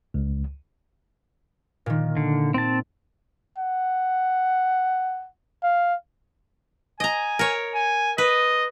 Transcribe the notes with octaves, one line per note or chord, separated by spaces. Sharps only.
C#2
A#2 D#3
D3
C4 A5
F#5
F5
D#5 G#5 A#5
A#4 C#5
G#5
B4 D#5